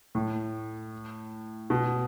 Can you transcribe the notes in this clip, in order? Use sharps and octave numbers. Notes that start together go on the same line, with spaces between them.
A2
B2